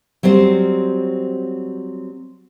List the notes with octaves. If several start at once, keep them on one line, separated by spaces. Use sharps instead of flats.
F#3 G3 C4 C5